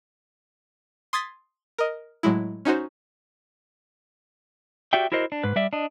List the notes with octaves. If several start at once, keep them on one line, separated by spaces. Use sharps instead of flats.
C6 D#6 G#6 A6 B6
A#4 D#5
A2 F#3 G#3 E4
C#4 D#4 F#4 C5
F#4 G4 D5 E5 G5
E4 F#4 A#4 C5 D#5
D4
G#2 B4
G3 D5 E5
D4 D#5